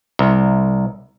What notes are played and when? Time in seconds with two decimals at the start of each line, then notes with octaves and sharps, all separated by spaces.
0.19 C2